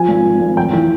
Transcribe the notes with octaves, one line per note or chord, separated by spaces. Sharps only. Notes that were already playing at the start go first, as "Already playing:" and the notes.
Already playing: F3 G#5
G#1
G#1
G#1
F1 G5
E3